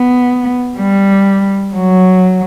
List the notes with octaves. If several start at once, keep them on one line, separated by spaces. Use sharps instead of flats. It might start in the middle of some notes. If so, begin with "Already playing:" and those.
Already playing: B3
G3
F#3